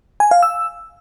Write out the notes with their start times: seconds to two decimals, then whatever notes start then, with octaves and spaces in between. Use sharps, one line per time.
0.20 G#5
0.31 F5
0.43 E6